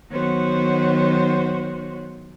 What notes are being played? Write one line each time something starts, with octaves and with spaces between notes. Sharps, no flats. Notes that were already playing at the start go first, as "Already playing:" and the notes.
D#3 F#3 B3 F#4 C5 C#5